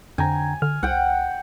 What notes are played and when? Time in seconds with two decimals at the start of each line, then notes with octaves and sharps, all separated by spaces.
0.18 F2 D3 G5 G#5 A#5
0.62 D3 F6
0.83 C2 F#5 G5